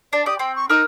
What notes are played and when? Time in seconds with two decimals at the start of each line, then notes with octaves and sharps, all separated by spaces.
0.13 D4 D5
0.26 G4 D5 D#6
0.39 C4 G5
0.56 C#6
0.70 D#4 A#4 D#6 E6